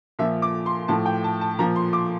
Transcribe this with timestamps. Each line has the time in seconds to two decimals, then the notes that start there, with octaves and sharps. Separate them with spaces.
0.19 A#2 F3 E5
0.42 D6
0.66 C6
0.88 A2 F3 A5
1.06 G5
1.24 A5
1.41 A5
1.59 A#2 F3 A#5
1.76 C6
1.93 D6